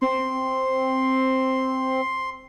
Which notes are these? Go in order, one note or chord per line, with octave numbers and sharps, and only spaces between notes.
C4 C6